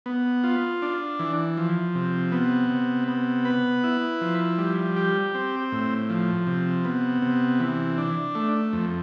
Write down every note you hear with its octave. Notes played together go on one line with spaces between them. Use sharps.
B3
F4
D4
E3
F3
C3
B3
C3
B3
B4
E4
F3
G3
G4
C4
A2
F3
C3
B3
C3
E3
D4
A3
F2